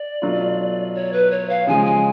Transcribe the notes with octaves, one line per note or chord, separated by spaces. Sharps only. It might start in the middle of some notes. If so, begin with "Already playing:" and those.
Already playing: D5
B2 F#3 A3 F4
C#5
B4
C#5
F5
C#3 F3 G#3 G#5
G#5